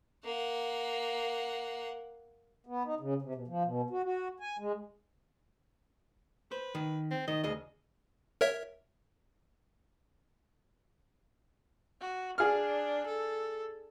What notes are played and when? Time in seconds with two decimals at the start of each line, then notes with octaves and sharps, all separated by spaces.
0.25 A#3 F#5
2.67 B3
2.85 D#4
3.00 C#3
3.22 C3
3.35 B2
3.47 F3
3.64 B2
3.90 F#4
4.03 F#4
4.40 G#5
4.59 G#3
6.51 B4 C5
6.75 D#3
7.11 C4
7.28 D#3 D#5
7.44 D2 G#4 D#5
8.41 A#4 C#5 E5
12.01 F#4
12.38 D4 G#4 F6
13.07 A4